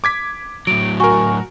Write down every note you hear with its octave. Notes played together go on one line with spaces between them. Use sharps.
D6 G#6 B6
A2 F#3 D7
F#4 A#4 G#5 C#6